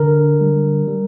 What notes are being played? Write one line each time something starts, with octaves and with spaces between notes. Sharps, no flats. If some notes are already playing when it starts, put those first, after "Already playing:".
Already playing: D3 A#4
G3
G3